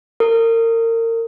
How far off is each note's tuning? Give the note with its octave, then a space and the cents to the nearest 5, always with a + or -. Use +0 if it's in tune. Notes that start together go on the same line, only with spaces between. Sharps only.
A#4 -35